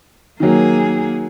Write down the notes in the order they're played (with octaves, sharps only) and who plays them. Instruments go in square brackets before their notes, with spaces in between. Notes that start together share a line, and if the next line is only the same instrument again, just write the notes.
[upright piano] D#3 F#3 [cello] A#3 G#4